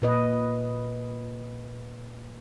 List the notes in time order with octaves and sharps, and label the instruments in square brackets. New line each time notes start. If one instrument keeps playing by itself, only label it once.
[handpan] A#2 B4 D#5